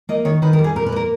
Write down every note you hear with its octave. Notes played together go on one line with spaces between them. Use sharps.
A#3 D#5
D#3 C#5
D#3 B4
A#4
G3
G#4
A#2 A#4
B4
A#3 A#4